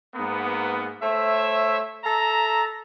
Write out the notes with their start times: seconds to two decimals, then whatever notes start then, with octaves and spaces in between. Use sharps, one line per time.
0.15 G#2 A#3 B3
1.02 A3 C5 C#5 E5
2.04 A4 E5 A#5